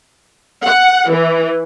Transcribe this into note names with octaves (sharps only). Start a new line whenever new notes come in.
F#5
E3